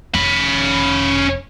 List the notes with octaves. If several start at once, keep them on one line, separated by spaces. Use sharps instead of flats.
F1 C#4 B5